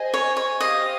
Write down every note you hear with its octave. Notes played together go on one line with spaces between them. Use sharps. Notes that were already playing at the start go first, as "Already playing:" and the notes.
Already playing: G#4 C5 D#5 G#5
C#5
C#5
G4 C5 D#5 F5